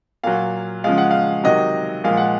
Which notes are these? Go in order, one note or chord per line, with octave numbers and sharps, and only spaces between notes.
A#2 F#3 F5
C#3 F3 G#3 F5
F#5
F5
C3 D#3 F#3 D#5
A#2 F3 G#3 F5
F#5